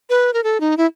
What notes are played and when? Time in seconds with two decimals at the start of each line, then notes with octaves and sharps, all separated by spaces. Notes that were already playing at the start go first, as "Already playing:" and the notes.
0.10 B4
0.33 A#4
0.44 A4
0.60 D#4
0.77 E4